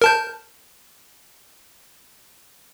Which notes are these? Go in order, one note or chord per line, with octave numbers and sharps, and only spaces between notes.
A#4 A5 G6